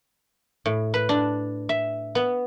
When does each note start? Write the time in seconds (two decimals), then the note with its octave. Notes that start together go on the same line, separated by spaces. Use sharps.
0.66 A2
0.94 B4
1.09 D4
1.69 E5
2.15 B3